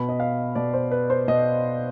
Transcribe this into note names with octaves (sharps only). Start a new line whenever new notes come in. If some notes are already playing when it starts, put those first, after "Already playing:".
Already playing: B2 B5
D#5
F5
B2 D5
C5
B4
C5
B2 D#5